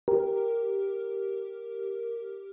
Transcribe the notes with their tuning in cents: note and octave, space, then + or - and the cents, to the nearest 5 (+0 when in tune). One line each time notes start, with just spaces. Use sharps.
G4 +0 A#4 +0